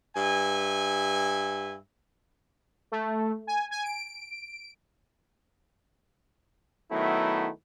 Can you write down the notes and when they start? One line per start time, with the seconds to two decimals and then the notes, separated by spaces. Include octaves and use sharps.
0.15 G2 E5 G#5
2.92 A3
3.47 G#5
3.71 G#5
3.84 D7
6.91 D#3 F#3 A3 B3 E4